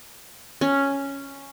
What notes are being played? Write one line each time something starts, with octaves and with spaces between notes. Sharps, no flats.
C#4